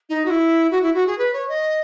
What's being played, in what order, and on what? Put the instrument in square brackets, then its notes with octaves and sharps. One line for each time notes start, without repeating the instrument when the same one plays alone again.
[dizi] D#4
F#4
E4
F#4
E4
F#4
G#4
B4
C#5
D#5